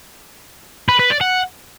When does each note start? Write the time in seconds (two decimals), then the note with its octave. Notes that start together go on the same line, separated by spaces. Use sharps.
0.89 B4
0.99 B4
1.10 D5
1.21 F#5